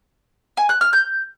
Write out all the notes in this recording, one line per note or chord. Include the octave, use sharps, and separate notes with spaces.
G#5
F#6
F6
G6